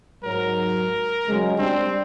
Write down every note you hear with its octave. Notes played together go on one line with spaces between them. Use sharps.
G#2 F#3 A#4
C#3 F#3 G#3
G3 C4 D4